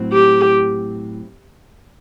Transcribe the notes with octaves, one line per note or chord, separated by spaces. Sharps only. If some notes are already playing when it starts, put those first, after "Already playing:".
Already playing: A2 F#3 C4
G4